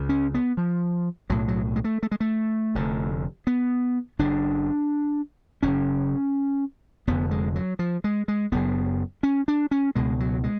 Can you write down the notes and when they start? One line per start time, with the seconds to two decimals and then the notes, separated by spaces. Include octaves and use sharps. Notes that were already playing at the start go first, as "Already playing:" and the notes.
Already playing: C#2 C#3
0.09 C#4
0.34 B3
0.57 F3
1.30 B1 A2 F#3
1.48 F#3
1.76 G#3
1.84 A3
2.03 A3
2.12 G#3
2.20 A3
2.75 F1 F2 D3
3.47 B3
4.19 F#1 F#2 C#3 D4
5.63 F#1 F#2 C#3 C#4
7.07 F1 F2 D3 B3
7.31 G#3
7.56 F#3
7.79 F3
8.04 G#3
8.28 G#3
8.52 F#1 F#2 C#3 B3
9.23 C#4
9.48 D4
9.71 C#4
9.95 C#2 B2 G#3
10.20 F#3
10.44 G#3